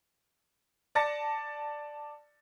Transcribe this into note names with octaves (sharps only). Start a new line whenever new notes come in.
D5 A5 A6 A#6 C#7